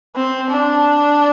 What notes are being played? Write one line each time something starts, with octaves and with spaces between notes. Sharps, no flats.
C4
D4